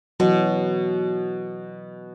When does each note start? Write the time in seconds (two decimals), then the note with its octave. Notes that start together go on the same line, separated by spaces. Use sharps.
0.20 B2 E3 F#3